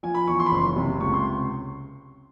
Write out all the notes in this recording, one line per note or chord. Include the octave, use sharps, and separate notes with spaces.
F3 G#5
B5
E2 C#6
C6
B5
F#1 C6
C3
C#2 C#6
C6